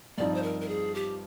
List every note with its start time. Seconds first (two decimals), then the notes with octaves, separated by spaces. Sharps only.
0.18 G2 F3 C4 D#4 D5
0.34 C5
0.43 A#4
0.61 A#4
0.68 G#4
0.95 G4